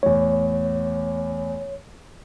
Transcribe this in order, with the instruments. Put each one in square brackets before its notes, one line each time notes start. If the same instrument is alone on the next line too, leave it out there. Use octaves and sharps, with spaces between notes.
[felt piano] E2 A2 [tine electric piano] C#5